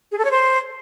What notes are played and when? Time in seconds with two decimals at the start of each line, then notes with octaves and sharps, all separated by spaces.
0.11 G#4
0.18 A4
0.24 C#5
0.31 C5